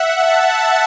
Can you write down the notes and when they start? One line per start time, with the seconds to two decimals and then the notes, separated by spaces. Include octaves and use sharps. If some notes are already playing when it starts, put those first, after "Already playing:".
Already playing: E5 F#5
0.17 A5